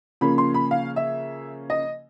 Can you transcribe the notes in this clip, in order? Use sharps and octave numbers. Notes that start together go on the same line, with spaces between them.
C#3 F3 A#3 C#4 B5
C6
B5
F5
E5
D#5